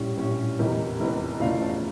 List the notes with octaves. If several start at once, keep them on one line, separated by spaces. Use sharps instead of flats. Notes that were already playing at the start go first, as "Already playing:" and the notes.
Already playing: A#1 A2 G3 C#4
A#1 A2 G3 C#4
F1 E2 E3 G4 A#4
F1 E2 E3
E1 E2 C#3 F3 A3 D5 F5
F5 A5